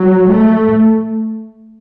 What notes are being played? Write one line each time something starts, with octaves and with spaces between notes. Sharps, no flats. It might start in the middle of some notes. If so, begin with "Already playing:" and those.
Already playing: F#3
A3